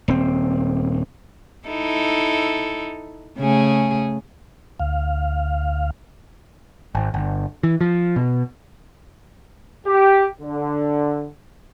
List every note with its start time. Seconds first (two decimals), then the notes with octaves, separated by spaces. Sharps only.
0.08 D#1 C4
1.68 D#4 E4 A4
3.38 C#3 A3 G#4
4.80 D2 F5
6.95 G#1
7.14 G1
7.63 E3
7.81 F3
8.16 B2
9.87 G4
10.41 D3